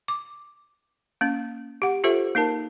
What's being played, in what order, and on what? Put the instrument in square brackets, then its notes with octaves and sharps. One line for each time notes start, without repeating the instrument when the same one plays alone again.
[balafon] D6
A#3 C#4
G4 F#5
F4 G4 A4 C5 E5
A#3 D#4 A#4 A5